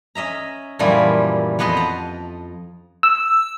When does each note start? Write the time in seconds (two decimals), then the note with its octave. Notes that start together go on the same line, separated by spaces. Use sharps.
0.15 C#4 D#5 E5 A#5
0.79 F#2 A#2 E3 F3 G3 F4
1.59 F2 B3 B4 D#5 C6
1.77 A5 A#5
3.03 E6